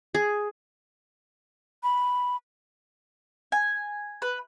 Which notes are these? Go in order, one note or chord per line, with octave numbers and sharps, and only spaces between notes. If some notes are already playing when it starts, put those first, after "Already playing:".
G#4
B5
G#5
B4